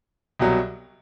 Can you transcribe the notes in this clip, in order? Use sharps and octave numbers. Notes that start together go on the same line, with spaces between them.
C2 B2 F#3